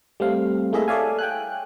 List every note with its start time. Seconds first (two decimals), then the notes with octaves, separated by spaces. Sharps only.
0.20 G3 A3 C4 F5
0.73 A3 A#3 E4 G#4 D#5 E5
0.88 A4 C#5 D5 E5 F5 G#5
1.19 G5 G#5 F#6